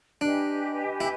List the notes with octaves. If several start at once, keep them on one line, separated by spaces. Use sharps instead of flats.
D4 G4 B4 D#5 G#5
E4